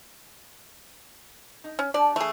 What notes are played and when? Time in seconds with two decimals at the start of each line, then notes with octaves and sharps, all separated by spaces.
1.64 D#4
1.79 C#4
1.94 G3 D4 D5 A5
2.16 E3 A3 G#4